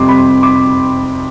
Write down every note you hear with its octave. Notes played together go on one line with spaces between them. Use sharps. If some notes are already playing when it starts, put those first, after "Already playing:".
Already playing: F2 C3 G3 C6 D6
B5
C6
D6